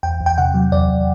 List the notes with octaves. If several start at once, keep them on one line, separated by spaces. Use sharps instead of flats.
E2 G5
E2
G5
C3 F#5
F#3
E2 D5
E2